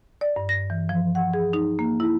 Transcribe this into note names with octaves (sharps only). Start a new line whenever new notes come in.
D5
G2
A#6
E3
F3
F#5
G#4
D#4
A#3
E4